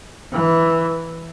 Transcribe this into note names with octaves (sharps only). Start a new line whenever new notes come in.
E3